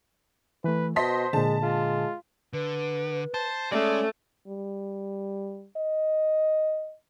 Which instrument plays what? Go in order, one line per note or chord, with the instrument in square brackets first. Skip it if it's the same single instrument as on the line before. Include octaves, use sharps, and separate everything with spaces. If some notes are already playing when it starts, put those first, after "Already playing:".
[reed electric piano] E3 A3 [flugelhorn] B4
[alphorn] B2 [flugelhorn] C5 [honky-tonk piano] D#5 C6 B6 [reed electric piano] A5
[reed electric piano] A#2 D3 [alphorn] G#3 [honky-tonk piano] A5
[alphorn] G#3 [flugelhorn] F4
[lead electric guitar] D3 [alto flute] B4
[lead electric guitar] C5 [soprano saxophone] A5
[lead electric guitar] G#3 [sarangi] A3 [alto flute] C#4 [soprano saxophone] D5
[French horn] G3
D#5